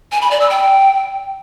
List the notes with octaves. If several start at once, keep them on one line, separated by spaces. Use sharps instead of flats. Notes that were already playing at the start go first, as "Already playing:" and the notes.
G#5
B5
D5
E6
G5